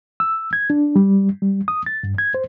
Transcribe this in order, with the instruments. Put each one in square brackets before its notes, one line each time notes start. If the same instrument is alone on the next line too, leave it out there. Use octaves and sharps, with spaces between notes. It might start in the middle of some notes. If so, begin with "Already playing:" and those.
[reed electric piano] E6
G#6
D4
G3
G3
D#6
A6
G2
G#6
C5